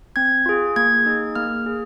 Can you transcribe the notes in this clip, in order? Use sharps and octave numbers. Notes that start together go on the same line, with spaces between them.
C4 G#6
F4 G#4
A#3 G#6
D#4 G#4
A#3 F6
G#4